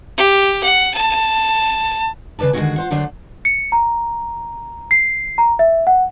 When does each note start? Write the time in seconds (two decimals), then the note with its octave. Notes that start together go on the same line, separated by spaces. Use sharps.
0.17 G4
0.64 F#5
0.94 A5
2.39 C#3 F#3 B4 D5 A5
2.53 D3 D#3 G#3 C#4 F#4 G#4
2.76 F4 C5 F#5
2.91 D3 F#3 A3 A#3 D4 C5
3.45 C#7
3.72 A#5
4.91 C7
5.38 A#5
5.59 E5
5.87 F#5